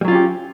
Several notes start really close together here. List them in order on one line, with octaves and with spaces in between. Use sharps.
G3 F#3 F4 C#4 G4